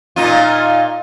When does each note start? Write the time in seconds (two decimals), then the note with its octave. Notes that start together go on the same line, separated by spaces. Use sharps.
0.16 A#2 D#4 F4